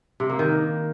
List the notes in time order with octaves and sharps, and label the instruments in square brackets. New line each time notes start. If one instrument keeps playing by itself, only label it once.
[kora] C3
A#3
D#3